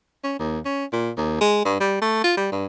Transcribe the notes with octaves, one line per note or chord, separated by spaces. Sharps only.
C#4
D#2
C#4
A#2
D#2
G#3
G2
G3
A3
F4
G3
G2